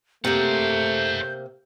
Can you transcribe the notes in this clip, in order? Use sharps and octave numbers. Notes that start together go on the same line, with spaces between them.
C3 A3 A#3 C5 F#5 G6